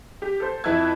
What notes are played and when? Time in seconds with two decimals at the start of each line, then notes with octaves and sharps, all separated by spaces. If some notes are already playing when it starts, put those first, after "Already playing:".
0.22 G4
0.40 A4 C5
0.64 F2 E4 B4 A5 E6 G#6